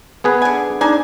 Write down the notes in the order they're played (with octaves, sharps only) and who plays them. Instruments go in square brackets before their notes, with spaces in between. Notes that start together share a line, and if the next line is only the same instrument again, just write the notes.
[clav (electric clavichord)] B3 G#4 B4
[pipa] D3 G#5
[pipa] G#3 D#4 G#5 [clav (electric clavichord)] D4